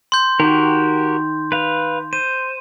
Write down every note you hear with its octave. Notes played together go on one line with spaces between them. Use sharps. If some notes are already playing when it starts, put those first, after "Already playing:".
C6 G6
D#3 F#4 G4 A#4
B4 F5
C5 D#7